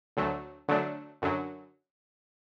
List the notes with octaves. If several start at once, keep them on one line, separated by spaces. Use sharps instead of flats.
D2 D3 F#3 A3
D3 F#3 A3 D4
F#2 D3 F#3